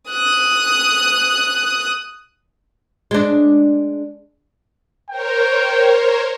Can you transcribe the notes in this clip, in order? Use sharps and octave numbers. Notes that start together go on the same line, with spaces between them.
D#6 F#6
G#3 D4
A#4 C5 C#5 G5